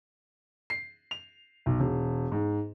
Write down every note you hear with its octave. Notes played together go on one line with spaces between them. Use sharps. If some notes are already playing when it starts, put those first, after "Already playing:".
C7
F7
B1
E1
G#2